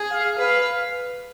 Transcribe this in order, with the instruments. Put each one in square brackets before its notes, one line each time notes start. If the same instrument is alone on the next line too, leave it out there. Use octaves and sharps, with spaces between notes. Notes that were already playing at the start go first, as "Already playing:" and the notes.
Already playing: [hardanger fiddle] G#4
[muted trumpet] F5
[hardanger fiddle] B4 [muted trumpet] F5